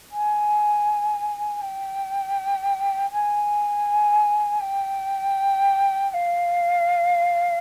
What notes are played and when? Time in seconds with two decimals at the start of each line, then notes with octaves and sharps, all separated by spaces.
0.11 G#5
1.61 G5
3.11 G#5
4.60 G5
6.10 G5
6.13 F5